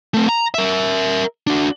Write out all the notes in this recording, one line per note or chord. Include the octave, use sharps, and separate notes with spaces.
A3 C4
A#5
A#4 E5
D4 F#4